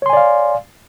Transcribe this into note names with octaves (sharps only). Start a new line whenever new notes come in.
C#5 D5 F5 G#5 C6